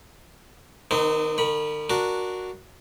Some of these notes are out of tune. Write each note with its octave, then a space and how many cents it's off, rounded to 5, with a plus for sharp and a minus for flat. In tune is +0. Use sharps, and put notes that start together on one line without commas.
D#3 +0 C4 -45 D#4 -40
D#3 -45 B5 -20
D4 +0 F#4 -5 A#4 +0